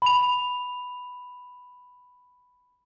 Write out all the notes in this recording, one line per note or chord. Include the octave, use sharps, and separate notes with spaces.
B5 F7